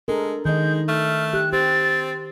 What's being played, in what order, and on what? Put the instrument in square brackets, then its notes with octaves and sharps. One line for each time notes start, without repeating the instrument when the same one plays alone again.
[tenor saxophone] G#3 [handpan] D4 A4 A#4
[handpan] D#3 D#5 [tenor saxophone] G#3 [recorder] G6
[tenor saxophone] A3 [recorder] F6
[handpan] G4 [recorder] F#6
[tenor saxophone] C4 [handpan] G4 [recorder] A6